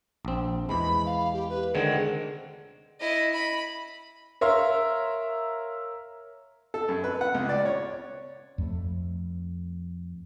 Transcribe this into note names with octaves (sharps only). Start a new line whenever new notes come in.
A#1 C4
E2 E3 G#3 B5
F5
G4
B4
D3 D#3 G#3 C4 F#5
E4 D#5
B5
A#4 C#5 E5 F5 C6
A4
F#2
B4
F#5
C#2
D5
C#5
F2 A3